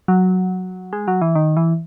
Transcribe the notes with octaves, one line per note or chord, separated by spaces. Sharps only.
F#3
G#3
F#3
E3
D#3
E3